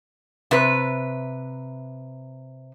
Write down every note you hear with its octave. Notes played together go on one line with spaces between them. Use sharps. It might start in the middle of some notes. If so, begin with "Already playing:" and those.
C3 B4